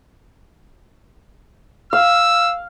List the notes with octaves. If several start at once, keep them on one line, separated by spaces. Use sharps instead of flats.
F5 E6